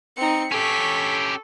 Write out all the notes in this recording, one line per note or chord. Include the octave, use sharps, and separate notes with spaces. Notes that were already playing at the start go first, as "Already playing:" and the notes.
C4 D#4 C#7
C#4 G4 A4 C#6 B6